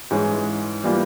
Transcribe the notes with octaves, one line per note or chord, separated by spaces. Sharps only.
G#2 E3 G#3 C#4
E3 G3 A#3 F4